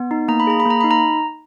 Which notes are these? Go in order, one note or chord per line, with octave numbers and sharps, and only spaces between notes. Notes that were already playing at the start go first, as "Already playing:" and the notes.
Already playing: B3
D#4
A#3 A#5
B5
G#4 A#5
B5
A#3 A#5
D#4 B5
A#5